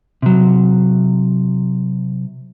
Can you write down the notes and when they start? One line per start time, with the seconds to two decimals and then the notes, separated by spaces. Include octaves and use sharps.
0.22 C3 F#3